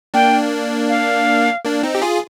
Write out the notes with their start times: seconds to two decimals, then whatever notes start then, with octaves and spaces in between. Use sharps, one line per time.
0.14 A#3 D4 G5
0.89 F5
1.64 A#3 D4
1.83 C4 D#4
1.95 G4
2.02 F4 G#4